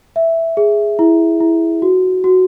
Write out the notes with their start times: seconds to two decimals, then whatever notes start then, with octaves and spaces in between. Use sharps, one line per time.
0.16 E5
0.57 G#4
0.99 E4
1.40 E4
1.82 F#4
2.24 F#4